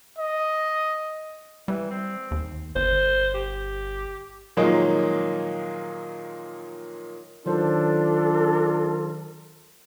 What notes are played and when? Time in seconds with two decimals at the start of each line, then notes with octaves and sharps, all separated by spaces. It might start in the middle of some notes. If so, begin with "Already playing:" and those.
0.18 D#5
1.68 E3 G3
1.91 C4
2.31 D#2
2.76 G1 C5
3.34 G4
4.57 A#2 D#3 F3 F#3 G#3 A#3
7.46 D#3 F#3 D4 F4 A4 C5